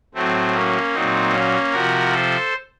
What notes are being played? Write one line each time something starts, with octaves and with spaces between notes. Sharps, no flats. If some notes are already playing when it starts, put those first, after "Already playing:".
A2 F#3 A3 C4
A#3 C#4
A#2 F#3 C4 D#4
A#3 C#4
C3 F3 F#4 A#4
A4 C5